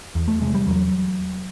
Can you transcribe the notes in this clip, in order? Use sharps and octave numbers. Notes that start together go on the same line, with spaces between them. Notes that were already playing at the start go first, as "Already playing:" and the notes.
E2
A3
C3 G#3
G3
E2 F#3